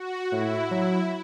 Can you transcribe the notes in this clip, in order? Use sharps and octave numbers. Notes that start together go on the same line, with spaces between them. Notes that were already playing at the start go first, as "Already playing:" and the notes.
Already playing: F#4
A2 E4
F#3